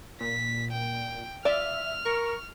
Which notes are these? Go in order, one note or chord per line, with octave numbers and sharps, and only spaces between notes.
A#2 B6
G5
F4 D5 E5 F6
A#4 C#6